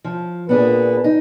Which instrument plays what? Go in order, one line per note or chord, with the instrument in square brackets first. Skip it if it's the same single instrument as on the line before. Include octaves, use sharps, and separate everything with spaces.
[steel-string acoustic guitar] F3
[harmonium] A#2 B4 [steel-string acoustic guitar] B3 D4 G#4
[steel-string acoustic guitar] D#4